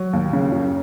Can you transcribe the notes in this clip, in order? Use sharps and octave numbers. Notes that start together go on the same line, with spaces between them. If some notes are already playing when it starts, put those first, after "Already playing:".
Already playing: F#3
D#2
C#3
F#2